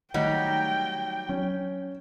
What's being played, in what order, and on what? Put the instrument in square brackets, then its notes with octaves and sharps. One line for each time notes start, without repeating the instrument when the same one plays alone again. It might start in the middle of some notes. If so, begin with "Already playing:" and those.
[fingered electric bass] D#3 A3 [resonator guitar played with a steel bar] F#3 G3 D#4 [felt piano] F#5 [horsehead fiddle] G5
[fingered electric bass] F#3 [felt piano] C#4